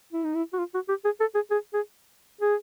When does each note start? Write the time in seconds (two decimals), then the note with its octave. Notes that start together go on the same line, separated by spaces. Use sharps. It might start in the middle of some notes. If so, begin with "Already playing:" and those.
0.13 E4
0.24 D#4
0.35 E4
0.53 F#4
0.59 F4
0.74 F#4
0.89 G4
1.05 G#4
1.20 A4
1.35 G#4
1.51 G#4
1.74 G#4
2.41 G#4